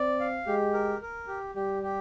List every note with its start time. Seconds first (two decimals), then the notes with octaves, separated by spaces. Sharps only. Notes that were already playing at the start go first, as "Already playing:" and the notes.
Already playing: C4 D5
0.20 F5
0.47 G#3 G4
0.73 A#4
1.02 A#4
1.28 G4
1.55 G3 G4
1.83 G4